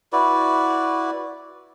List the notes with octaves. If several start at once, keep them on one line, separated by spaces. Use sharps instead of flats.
E4 F#4 B4 D5